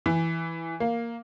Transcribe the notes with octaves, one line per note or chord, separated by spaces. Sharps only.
E3
A#3